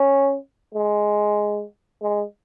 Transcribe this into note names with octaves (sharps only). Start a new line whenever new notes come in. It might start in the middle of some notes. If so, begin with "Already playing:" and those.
Already playing: C#4
G#3
G#3